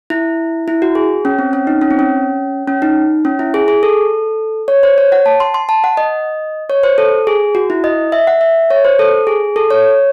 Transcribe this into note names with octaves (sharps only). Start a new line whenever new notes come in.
E4
E4
F#4
G#4
C#4
C4
C#4
D#4
C#4
C4
C#4
C#4
D#4
C#4
E4
G#4
G#4
A4
C#5
C5
C#5
F#5
A5
C6
C6
A5
F#5
D#5
C#5
C5
A4
G#4
F#4
E4
D#5
E5
F#5
E5
C#5
C5
A4
G#4
A4
C#5